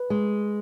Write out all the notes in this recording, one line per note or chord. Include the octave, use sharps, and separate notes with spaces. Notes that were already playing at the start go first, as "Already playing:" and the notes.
Already playing: B4
G#3